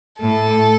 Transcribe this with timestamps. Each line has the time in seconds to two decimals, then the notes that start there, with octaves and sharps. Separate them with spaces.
0.20 A2 A4